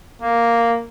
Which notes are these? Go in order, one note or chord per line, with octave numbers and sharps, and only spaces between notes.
A#3